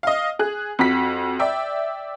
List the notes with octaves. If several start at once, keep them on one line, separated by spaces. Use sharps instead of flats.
D#5 F5
G#4 F#6
F2 F#4 B6
D5 E5 G5